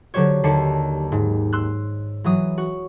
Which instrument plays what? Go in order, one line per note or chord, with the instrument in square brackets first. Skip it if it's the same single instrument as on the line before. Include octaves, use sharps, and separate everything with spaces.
[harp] D3 F#3 G4 C5 C#5
D#2 D3 A5 C7 C#7
G#2
C6 E6 F#6
E3 F#3 D#6
F#4